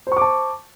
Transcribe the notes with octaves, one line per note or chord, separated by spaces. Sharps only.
C5 A5 C#6 D6